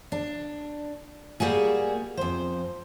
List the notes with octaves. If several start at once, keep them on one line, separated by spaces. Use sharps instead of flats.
D4
G3 A#3 F#4 G#4
F2 C5